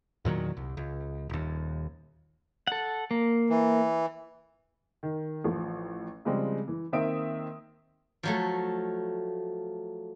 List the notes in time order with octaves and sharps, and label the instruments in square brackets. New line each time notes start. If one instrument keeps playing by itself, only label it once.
[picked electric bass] E2 A#2 D#3 F#3
C2
C#2
D#1 D#2
[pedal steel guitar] A4 F#5
A#3
[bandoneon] E3
[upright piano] D#3
A1 F3
C#3 F3 G3 G#3 C4
E3
D#3 A#3 C4 E5 D#6 D7
[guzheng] F3 F#3 A3